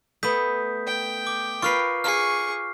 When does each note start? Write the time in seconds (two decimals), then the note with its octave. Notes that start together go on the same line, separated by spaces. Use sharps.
0.23 A3 B3 D#6 G6 B6
0.87 G5
1.27 D6
1.62 F4 A#4 B4 C#6 F6 C7
2.04 G#4 C#6 F6 C7